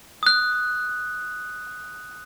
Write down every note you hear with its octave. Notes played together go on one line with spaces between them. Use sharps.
D#6 F#6